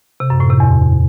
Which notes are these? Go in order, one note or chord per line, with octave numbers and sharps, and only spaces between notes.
C3
F#2
A2
C3
E2